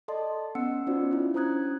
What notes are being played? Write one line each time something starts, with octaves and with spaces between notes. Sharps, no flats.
A4 D5 D#5 A5 C6
B3 C#4 F#5 E6 C#7
C#4 D#4 F4 F#4 C5 D5
D4 E4 F4
C#4 C5 A#5 D#6 F#6 G#6